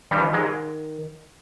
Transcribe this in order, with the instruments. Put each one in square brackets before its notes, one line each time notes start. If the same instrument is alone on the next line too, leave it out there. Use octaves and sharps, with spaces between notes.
[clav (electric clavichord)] G2 G3 [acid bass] D#3
[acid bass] F3
D#3
[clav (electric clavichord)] G#2 G#3